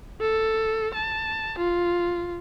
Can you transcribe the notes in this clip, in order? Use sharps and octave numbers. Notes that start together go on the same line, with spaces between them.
A4
A5
F4